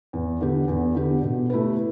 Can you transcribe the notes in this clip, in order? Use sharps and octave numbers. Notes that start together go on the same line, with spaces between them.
E2
D3 B3 G4
E2
D3 B3 G4
B2
A3 E4 G4 B4